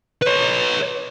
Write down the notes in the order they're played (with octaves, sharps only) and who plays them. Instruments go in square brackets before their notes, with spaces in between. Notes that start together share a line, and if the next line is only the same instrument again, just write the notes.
[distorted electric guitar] B4 C#5